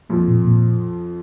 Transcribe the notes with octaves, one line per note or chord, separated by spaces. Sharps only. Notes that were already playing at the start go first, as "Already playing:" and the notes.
F2 F3 A#3
A#2
A#2